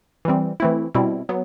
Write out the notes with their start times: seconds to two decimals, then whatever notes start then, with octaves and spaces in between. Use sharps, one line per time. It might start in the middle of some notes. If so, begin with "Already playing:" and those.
0.25 E3 G3 C4
0.60 E3 A3 C4 E4
0.95 B2 G3 C4 E4
1.29 F#3 B3